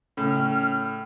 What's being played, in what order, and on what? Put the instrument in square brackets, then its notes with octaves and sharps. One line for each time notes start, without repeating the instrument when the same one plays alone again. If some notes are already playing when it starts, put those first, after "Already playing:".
[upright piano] A2 [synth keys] C#3 C#4 [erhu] F6